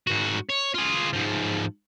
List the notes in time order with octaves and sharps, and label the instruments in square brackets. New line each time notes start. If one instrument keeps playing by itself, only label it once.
[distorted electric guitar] G#2 F#4
C#5
F4 G#4
G#2 F3